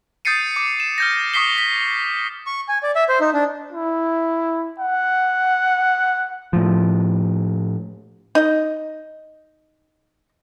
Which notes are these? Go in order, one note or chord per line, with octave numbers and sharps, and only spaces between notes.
D#6 G6 A6 C7 C#7 D#7
D6
E7
F6 G6 A#6
C#6 D#6 B6 C7 G7
B6
C#6
G#5
D5
E5
C5
D#4
D4
E4
F#5
A2 F3
D#4 D#5